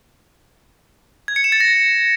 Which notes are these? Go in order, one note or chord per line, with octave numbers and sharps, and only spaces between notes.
G#6
C#7
E7
A6
A#6